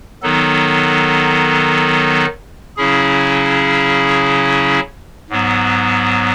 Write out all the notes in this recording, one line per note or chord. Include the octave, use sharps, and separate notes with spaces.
D#3 F#3 B3 D#4 A4
C#3 F#3 C#4 E4 G#4
G#2 F#3 B3